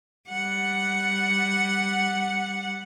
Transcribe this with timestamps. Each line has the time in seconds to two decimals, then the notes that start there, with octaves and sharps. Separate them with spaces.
0.29 G3 F#5